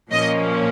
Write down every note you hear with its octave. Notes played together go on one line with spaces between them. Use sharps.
A#2 F3 A#3 C#4 D#5